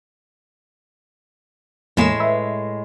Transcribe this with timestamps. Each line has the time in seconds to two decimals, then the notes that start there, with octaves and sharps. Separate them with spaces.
1.97 E2 A2 G#3 A#3 E7
2.20 B4 E5